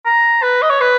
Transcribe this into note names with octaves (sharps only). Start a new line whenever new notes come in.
A#5
B4
D#5
C#5
B4